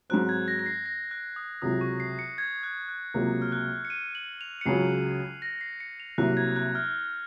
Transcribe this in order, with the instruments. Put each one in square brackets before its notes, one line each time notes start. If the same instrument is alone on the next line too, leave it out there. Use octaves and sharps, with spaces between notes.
[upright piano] G#2 F#3 C4 [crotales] F#6
[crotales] G#6
A#6
A#6
C7
A#6
F#6
D#6
[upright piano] C#2 C3 F#3 [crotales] D#6
[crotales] C#6
C7
C#7
G#6
F#6
F#6
[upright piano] C#2 C3 F#3 A#3
[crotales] F6
F#6
C#7
D#7
F#7
F7
C#7
[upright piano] C#2 C#3 F#3 [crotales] C7
[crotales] A#6
C7
C#7
F7
[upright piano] C2 C3 F#3 A#3 [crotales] F#6
[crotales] G#6
F#6
F6